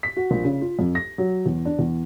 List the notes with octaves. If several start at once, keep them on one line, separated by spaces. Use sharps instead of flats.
B6
F#4
A#1
C#3
F4
F2
A#6
F#3
E2
D4
E2